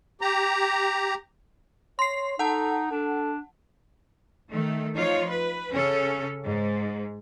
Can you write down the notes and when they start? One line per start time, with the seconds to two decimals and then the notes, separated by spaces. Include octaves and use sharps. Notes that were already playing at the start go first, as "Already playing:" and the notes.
0.21 G4 A#5
1.99 C#5 C6 C7
2.39 D#4 A4 F#5 A5
2.92 D4 A4
4.49 D#3 A3
4.96 F3 D#4 F4 C#5
5.28 B4
5.72 C#3 C#4 A4
6.45 G#2